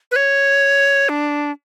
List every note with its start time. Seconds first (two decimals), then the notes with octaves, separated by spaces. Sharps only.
0.11 B4
0.16 C#5
1.09 D4